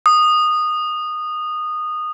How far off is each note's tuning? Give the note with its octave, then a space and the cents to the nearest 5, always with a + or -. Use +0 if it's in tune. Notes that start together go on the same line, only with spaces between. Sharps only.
D#6 -15